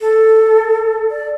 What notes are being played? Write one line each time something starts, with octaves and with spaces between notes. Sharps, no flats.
A4
D5